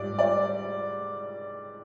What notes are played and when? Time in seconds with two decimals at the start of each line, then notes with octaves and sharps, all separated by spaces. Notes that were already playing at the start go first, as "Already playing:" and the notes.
Already playing: G#2 G3 D5
0.19 D5